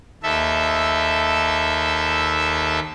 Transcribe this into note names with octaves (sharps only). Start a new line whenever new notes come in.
D#2 A4 E5